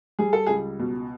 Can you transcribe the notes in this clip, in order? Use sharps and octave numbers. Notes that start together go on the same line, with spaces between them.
G3 G#4
A4
C#2 G#4
B2